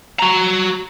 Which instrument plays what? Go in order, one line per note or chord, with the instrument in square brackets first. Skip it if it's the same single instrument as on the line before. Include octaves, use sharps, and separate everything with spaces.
[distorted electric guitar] F#4 A#5